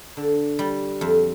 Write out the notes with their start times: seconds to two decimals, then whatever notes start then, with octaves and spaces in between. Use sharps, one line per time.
0.17 D3
0.59 G3
1.01 F2